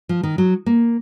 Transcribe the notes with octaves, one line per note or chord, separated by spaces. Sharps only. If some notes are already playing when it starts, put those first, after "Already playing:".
F3
D#3
F#3
A#3